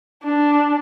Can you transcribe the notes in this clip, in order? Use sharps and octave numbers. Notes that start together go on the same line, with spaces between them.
D4